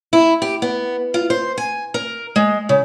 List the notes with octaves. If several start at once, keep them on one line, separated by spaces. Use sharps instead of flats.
E4
G4
B3
F4
C5
G#5
A#4
G#3
C#3